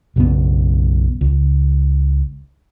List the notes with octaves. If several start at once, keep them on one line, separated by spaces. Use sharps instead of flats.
B1 F#2 C#3 B3
C#2